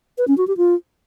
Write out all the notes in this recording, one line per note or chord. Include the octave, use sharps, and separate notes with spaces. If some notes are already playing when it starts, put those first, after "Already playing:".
B4
C#4
F#4
G4
F4